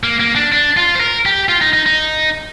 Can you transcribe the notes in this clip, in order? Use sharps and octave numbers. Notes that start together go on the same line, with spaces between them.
A#3
A#3
D4
D4
F4
C5
A#4
G4
F4
D#4
D#4
D#4